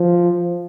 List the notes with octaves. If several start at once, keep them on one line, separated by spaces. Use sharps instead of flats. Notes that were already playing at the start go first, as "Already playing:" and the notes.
Already playing: F3